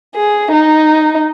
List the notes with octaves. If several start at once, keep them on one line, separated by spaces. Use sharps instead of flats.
G#4
D#4